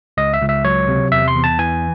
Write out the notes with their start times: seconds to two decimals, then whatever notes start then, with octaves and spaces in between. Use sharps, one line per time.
0.17 C#2 D#5
0.34 E5
0.41 C#2
0.49 E5
0.65 F#3 C#5
0.88 C3
1.12 E2 E5
1.28 C6
1.36 E2
1.44 A5
1.59 E3 G#5